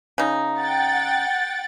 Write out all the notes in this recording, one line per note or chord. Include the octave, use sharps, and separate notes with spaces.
C#3 D#4
F#5 G5 A6